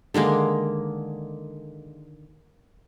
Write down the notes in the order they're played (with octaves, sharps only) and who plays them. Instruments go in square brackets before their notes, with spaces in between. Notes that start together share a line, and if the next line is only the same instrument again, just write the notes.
[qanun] D3 D#3 G#3 A#3